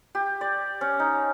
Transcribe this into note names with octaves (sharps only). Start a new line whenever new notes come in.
G4
D5
C#4
D#4